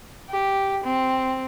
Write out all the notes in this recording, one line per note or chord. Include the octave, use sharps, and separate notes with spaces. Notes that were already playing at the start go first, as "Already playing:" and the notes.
G4
C4